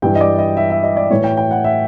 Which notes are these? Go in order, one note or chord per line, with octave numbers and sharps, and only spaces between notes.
G2 E3 G5
D#5
D5
D#5
E5
E5
D#5
D5
A2 E3 C#5
G5
G5
F#5
E5